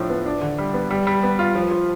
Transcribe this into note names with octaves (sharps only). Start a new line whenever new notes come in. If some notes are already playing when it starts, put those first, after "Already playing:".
Already playing: A2 F3 D4
B3
D4
D3
G3
B3
G3
G3
B3
F4
F3
F3